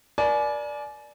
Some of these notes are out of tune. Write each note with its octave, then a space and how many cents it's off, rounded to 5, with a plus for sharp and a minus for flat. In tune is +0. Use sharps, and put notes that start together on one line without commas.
A#4 +35 D5 +0 G#5 +35